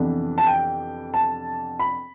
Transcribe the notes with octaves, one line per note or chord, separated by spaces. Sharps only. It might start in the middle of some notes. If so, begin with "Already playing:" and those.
Already playing: F2 C3 E3 B3 D4
A5
G5
A5
B5